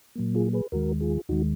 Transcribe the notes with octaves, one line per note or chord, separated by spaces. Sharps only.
A#2 F#3 A#3
F4 G#4
G#4 B4
D#2 D#3 G#3 F#4 A#4
F4 G#4
D#2 D#3 G#3 D#4 F#4